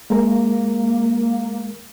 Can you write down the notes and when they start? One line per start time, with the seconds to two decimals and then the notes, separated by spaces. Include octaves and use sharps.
0.10 G#3 A#3 A#4